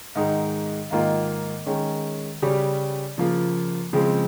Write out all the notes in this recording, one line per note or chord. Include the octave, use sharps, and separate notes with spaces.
G#2 D#3 G#3 D#4
G#2 D#3 A#3 F4
D#3 G#3 C#4
C#3 G3 C#4 G4
C#3 F3 A#3 F4
C#3 F3 G#3 C4